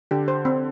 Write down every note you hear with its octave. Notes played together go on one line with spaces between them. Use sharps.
D3 G4
C5
C4